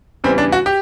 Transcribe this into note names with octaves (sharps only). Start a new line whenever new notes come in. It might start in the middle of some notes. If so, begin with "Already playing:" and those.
E2 C#3 E3 G3 C4
D4
F#4
G4